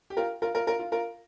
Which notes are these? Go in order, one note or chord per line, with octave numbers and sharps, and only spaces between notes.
G4
F4 A#4
F4 A#4
F4 A#4
F4 A#4
F4
F4 A#4